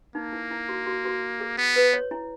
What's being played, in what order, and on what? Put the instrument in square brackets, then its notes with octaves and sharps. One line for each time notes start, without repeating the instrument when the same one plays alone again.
[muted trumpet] A#3 [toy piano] D#4
[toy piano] E4
E4
F#4
F#4
F#4
G#4
[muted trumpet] B3
[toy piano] B4
C#5
E4